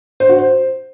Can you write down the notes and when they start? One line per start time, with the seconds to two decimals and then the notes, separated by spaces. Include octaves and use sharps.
0.20 C5
0.29 F#4
0.39 C5